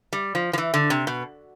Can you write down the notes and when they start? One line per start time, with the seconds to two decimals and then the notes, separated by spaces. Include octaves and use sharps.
0.13 G3
0.35 F3
0.53 F3
0.58 E3
0.74 D3
0.90 C3
1.07 B2